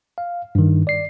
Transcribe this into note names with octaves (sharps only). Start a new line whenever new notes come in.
F5
G2 D#3
D5 C7